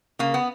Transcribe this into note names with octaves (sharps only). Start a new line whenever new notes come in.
C#3 A#3
B3